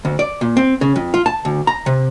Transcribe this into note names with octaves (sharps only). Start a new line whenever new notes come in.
D2
D5
A#2
C4
C#3
F2
F4
A5
D2
A#5
C3